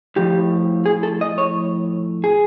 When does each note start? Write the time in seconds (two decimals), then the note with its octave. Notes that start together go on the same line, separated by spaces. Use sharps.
0.16 A2 F3 G4
0.86 G#4
1.03 A4
1.21 D#5
1.38 C#5
2.24 G#4